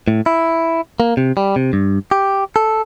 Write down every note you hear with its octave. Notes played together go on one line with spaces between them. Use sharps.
A2
E4
A#3
C3
G3
C3
G2
G4
A4